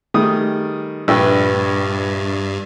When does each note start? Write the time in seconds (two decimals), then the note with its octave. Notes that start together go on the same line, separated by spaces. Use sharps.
0.14 D#3 G3 A3 G#4 D#6
1.08 A#1 G2 B4 G5 E6